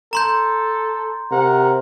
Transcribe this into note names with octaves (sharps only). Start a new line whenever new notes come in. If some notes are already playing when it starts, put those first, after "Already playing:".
A4 A#5 C6 G6
C3 A#4 F#5